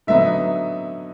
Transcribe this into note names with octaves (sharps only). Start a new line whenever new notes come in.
D3 F#3 B3 D#4 E5